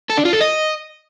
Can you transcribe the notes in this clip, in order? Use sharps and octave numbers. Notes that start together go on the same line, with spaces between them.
A4
D4
F4
A4
D#5